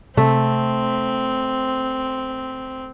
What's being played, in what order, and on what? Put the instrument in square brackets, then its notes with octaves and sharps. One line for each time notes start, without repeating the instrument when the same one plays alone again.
[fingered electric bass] C3 [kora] A3 [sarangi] C4